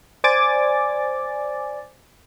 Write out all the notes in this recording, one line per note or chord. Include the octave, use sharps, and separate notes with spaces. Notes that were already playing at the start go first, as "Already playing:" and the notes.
C5 D5 G#5 D6 A6